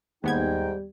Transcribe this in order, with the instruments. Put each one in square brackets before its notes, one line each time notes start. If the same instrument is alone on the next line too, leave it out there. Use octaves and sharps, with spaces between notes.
[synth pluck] D#2 B3 G#6 [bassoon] G#2 [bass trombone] G3 [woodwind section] D#4 G5